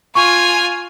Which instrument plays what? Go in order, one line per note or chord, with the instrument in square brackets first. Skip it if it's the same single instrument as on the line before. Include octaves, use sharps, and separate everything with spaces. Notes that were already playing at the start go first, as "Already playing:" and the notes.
[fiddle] F4 G#5 [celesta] C#6